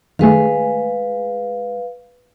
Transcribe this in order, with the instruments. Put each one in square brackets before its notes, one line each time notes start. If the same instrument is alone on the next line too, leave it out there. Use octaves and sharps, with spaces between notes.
[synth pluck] D#3 A3 [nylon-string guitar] G#3 G#4 [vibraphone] B4 F5